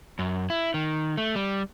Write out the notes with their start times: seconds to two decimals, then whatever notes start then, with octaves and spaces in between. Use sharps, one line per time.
0.19 F#2
0.50 E4
0.74 D#3
1.18 A3
1.36 G3